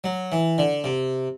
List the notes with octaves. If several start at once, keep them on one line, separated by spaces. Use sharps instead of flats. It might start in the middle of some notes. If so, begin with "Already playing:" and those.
F#3
E3
D3
C3